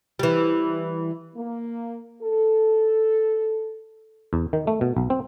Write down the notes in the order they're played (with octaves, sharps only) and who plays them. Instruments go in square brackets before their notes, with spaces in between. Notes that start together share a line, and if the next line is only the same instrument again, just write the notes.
[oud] E3 G3
[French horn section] A#3
A4
[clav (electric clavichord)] E2
D#3
A3
B2
B1
C4